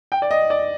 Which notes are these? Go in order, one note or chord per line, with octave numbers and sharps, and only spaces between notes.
G5
D5
D#5
D5